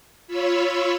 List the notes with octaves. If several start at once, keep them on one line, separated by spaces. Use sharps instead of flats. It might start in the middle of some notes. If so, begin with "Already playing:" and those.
F4 C#5 B5 E6